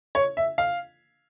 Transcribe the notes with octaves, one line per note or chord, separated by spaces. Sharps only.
C#5
E5
F5